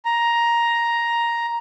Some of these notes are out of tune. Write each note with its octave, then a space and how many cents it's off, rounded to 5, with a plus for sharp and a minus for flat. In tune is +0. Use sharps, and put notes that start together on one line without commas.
A#5 +10